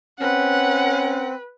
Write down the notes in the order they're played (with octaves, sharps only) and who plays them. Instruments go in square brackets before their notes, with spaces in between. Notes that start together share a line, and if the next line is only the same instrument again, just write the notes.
[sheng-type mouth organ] C4 [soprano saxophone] C#4 [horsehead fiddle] B4 [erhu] F#5